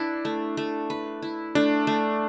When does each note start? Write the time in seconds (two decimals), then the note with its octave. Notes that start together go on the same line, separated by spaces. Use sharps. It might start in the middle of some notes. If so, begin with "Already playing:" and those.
Already playing: D4 E4 B4
0.25 A3
0.57 A3
0.90 B4
1.22 E4
1.55 A3 D4
1.87 A3